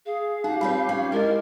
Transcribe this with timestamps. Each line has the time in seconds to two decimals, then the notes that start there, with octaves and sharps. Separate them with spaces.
0.06 G#4 F5
0.44 D#4 F#4 G4
0.61 G3 C4 F4 B4 C#5
0.89 C#4
1.12 G#3 E4 A#4 D#5